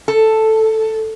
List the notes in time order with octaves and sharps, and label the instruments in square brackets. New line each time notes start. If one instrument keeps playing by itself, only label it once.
[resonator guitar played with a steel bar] A4